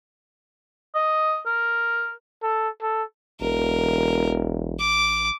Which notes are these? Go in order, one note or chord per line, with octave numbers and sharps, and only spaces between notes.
D#5
A#4
A4
A4
E1 A1 A#4
D6